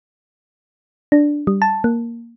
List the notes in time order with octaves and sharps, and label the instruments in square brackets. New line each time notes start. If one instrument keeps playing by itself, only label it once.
[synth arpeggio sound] D4
G3
A5
A#3